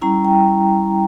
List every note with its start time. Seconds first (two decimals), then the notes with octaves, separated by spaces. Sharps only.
0.02 G3 C#4 E4 A#5
0.25 G5